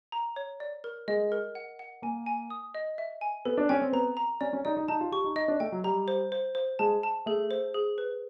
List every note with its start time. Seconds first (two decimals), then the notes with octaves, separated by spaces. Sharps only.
0.12 A#5
0.36 C#5
0.60 D5
0.84 A#4
1.08 G#3 D#5
1.32 A#4
1.55 F#5
1.79 F#5
2.02 A#3 G#5
2.26 G#5
2.50 D#6
2.75 D#5
2.98 E5
3.21 G#5
3.45 B3 A4
3.58 D4
3.69 C#4 G5
3.82 C4
3.93 B3 A#5
4.17 A#5
4.41 C#4 D5
4.53 C#4
4.65 D#4 D5
4.77 D#4
4.88 D#4 A5
5.01 F4
5.12 G4 C#6
5.24 D#4
5.36 D#4 D#5
5.48 D4
5.60 A3 G5
5.72 F#3
5.84 G3 A#5
6.08 C5
6.32 C5
6.55 C5
6.79 G#3 A5
7.03 A5
7.26 A3 G#4
7.51 C5
7.74 G#4
7.98 B4